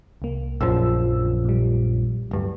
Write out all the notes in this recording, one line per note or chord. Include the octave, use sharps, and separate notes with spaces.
C2 A#3
A#1 F#2 F3 E6
A#2 G3
D1 G2